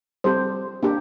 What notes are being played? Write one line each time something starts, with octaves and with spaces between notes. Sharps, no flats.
G3 C4 G4 A4 C5
A#3 D4 G4